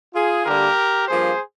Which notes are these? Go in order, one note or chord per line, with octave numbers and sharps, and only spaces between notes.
F4 G#4
D3 G3 A#3 G4 A#4
G2 F3 A#3 G#4 C5